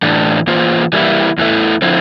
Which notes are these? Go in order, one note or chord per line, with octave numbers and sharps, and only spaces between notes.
A2 E3 A3 D4
E3 A#3 F4 C5
E3 G3 A#3 E4
E2 E3 A3 E4
D3 F3 C4 E4